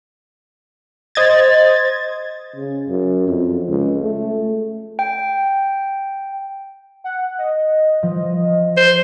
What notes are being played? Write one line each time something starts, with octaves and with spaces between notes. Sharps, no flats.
C5 D#5 G#6 A6
C#3
F#2
F2
C#2
A3
G5
F#5
D#5
F3
C5